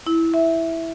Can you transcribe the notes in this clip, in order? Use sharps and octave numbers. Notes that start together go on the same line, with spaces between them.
E4
E5